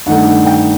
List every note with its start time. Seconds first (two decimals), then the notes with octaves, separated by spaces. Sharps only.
0.06 G2 D#3 A3 D#4 F#5
0.46 G5